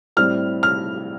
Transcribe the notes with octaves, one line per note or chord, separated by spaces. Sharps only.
A2 G3 C4 F6
F6